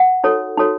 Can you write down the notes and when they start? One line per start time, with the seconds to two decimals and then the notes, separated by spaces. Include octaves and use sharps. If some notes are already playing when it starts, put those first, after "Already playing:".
Already playing: F#5
0.24 D#4 F#4 A4 C#5
0.57 D#4 F#4 A4 C#5